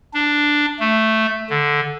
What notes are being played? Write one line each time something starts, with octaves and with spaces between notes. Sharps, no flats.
D4
A3
D3